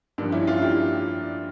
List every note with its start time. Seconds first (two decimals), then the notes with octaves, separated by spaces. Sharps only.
0.18 G2 F3 A#3 D4
0.32 C#4 E4
0.47 D4 F4
0.62 E4 G4